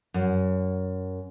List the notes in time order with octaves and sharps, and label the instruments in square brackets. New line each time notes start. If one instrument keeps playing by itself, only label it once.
[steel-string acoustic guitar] F#2